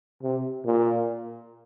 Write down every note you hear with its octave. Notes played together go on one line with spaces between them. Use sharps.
C3
A#2